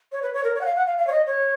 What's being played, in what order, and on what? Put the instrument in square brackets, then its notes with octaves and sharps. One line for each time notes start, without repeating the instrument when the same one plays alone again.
[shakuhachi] C#5
B4
C#5
A#4
C#5
F#5
F5
F#5
F5
F5
C#5
D#5
C#5